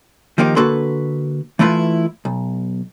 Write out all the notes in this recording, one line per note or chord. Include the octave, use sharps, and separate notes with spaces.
D#3 F3 A#3 D#4 G4
D3 A#3 F#4 A4 B4 C6
E3 A3 E4 F4 B4
B1